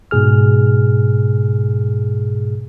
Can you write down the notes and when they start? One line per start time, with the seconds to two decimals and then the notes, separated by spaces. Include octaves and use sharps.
0.11 G#2 B2 G#4 F6